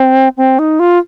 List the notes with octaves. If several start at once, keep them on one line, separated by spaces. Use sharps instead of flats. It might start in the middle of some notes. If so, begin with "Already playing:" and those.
Already playing: C4
C4
D#4
F4